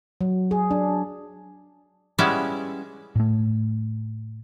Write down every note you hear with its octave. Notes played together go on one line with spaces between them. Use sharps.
F#3
G#4
D4
G3 G#3 B3 C#4 E4 E5
A2 A3